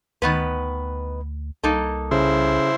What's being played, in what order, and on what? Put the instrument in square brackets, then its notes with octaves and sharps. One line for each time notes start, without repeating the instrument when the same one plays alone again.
[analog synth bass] D2 [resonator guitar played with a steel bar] D#3 B3 B4
[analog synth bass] C2 [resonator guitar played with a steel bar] A#3 D#4 A4
[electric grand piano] C#3 [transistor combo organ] E4 C5